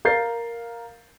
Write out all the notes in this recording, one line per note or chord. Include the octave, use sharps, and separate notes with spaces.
A#4 F5 G6 A6 C7